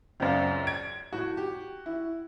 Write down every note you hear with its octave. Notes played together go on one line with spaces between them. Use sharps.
C#2 F#2 C4 D5 F5
G#6 D7
A2 F#4
G4
E4